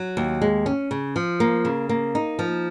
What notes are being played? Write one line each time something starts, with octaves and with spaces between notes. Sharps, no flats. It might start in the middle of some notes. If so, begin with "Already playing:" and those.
Already playing: F#3
D#2
G#3
C#4
C#3
F3
A#3
C#3
A#3
D#4
F3